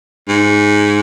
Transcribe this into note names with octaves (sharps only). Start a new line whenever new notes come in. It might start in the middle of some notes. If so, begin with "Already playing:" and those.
G#2